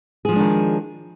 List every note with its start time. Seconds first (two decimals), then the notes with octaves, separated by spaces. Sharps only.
0.25 G#4
0.29 F3
0.32 G#3
0.36 D4
0.40 D#3